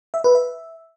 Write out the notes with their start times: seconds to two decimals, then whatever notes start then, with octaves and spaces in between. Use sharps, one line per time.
0.14 E5
0.24 B4
0.35 E5